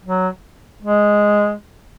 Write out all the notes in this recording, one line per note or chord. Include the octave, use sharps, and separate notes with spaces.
F#3
G#3